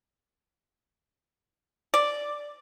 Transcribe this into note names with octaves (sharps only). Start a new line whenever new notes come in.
D5